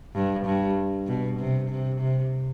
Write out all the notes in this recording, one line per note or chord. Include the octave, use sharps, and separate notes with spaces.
G2
G2
B2
C3
C3
C3